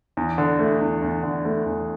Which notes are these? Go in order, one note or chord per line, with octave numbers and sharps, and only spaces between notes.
E2
D3
A3
E2
E2
D3
A3
E2